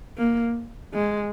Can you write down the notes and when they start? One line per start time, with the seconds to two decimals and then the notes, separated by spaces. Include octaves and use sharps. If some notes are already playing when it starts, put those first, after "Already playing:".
0.18 A#3
0.95 G#3